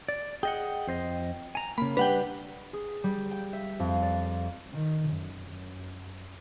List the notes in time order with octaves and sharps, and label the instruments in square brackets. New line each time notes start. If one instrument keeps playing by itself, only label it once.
[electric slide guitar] D5
[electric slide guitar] G#4 D#5 F#5 [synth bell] G5
[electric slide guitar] F2 C5 D#5
G#5 A#5
[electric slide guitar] C#3 A#3 [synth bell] B5
[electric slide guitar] G3 D4 [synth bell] B4 F#5 G5
[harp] G#4
G3
G5
E5
F2
D5
[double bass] D#3
F#2
F#2